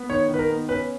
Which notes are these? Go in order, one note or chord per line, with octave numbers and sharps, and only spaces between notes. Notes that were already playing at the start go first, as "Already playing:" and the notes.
Already playing: B3
D#3 C#5
D#3 B4
A#4
B3
C#4 B4